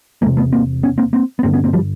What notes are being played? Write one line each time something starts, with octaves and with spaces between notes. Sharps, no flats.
E2 C3 G#3 A#3
A3 B3
A#3 C4
B3 C#4
A#3 C4
A#3 C4
B3
G2 D3 A#3 C4
B3 C#4
A#3 C4
F3 G3